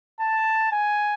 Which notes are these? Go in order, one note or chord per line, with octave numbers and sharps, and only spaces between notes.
A5
G#5